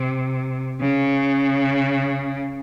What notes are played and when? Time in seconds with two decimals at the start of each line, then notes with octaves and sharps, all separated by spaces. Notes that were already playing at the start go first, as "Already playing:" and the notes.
Already playing: C3
0.81 C#3